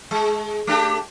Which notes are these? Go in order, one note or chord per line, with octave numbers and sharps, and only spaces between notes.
G#3
A3 D4 G4